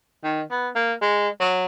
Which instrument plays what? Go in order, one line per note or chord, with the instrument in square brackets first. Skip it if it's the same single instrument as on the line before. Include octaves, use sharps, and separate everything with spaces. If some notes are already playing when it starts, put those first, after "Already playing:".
[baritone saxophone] D#3
B3
A#3
G#3
F#3